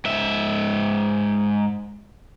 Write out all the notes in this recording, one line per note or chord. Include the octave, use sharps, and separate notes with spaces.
G#2 E5